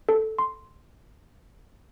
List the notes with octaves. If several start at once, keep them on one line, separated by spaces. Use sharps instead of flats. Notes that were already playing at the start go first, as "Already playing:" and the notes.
A4
C6